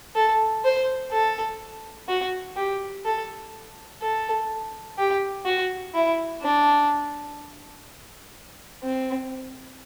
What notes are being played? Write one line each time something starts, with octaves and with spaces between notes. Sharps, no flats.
A4
C5
A4
F#4
G4
A4
A4
G4
F#4
E4
D4
C4